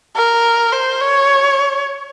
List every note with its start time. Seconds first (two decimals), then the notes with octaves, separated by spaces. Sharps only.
0.16 A#4
0.72 C5
1.01 C#5